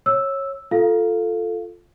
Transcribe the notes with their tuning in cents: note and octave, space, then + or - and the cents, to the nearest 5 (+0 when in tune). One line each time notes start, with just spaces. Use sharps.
C#5 -20 E6 +0
F4 +0 A4 +0 F5 +0